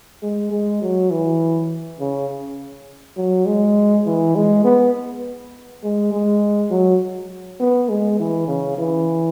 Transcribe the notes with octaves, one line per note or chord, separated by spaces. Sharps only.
G#3
G#3
F#3
E3
C#3
F#3
G#3
E3
G#3
B3
G#3
G#3
F#3
B3
G#3
E3
C#3
E3